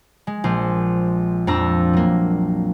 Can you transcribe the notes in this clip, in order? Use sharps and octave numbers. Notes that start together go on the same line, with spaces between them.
G#3
A#1 C5
F2 C4 D4 A#5 E6
F#3 A#3